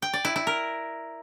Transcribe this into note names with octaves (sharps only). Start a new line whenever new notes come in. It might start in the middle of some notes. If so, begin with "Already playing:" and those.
G5
D5
E4
E4
A#4